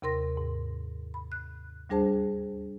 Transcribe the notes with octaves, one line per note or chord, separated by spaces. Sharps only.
D#2 C3 A#4 C6 A#6
G#2
B5
F#6
D2 G3 D4 G#4 C5 A5